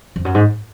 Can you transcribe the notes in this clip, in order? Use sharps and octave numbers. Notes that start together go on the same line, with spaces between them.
F2
F#2
G#2